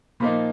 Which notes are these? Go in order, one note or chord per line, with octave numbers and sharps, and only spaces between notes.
A#2 F3 A#3 D#4 B5